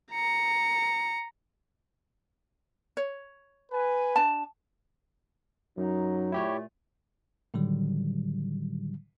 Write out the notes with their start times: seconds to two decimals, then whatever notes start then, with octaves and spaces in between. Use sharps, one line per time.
0.12 A#5 C#7
2.97 C#5
3.72 B4 G#5
4.16 D4 A5
5.77 F#2 F#3 D#4
6.32 A#2 A3 E4 G4 C#5
7.54 A2 D3 D#3 F#3 G3